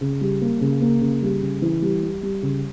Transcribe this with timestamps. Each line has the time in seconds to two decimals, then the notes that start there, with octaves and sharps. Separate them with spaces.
0.01 C#3
0.21 G3
0.41 A#3
0.61 C#3
0.81 A#3
1.01 C#3
1.22 G3
1.42 C#3
1.62 E3
1.82 G3
2.03 G3
2.23 G3
2.42 C#3